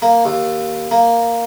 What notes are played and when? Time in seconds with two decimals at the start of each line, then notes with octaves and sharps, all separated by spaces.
0.02 A#3
0.25 D#2
0.91 A#3